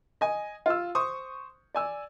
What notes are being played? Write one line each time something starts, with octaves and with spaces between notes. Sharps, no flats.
D#5 G#5
F4 E6
C5 C#6 D#6
D5 G#5 E6